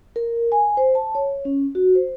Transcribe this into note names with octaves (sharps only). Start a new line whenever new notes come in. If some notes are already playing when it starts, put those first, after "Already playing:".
A#4
G#5
C5
A5
C#5
C#4
F#4
C5